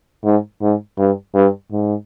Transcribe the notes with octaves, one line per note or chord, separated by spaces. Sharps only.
G#2
G#2
G2
G2
G#2